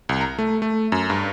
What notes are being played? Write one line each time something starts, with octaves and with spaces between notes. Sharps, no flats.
C2
A#5
A3
A3
F#2
G2